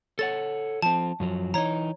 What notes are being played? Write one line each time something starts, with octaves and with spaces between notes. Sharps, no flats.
A4 C#5 F#5 A6
F3 C4 A5
F#2 F3 F#3
E3 D#4 C#5 A#5